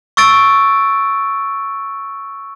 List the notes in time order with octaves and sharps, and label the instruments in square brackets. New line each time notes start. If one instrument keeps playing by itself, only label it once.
[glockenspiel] C#6 E6 A6 D7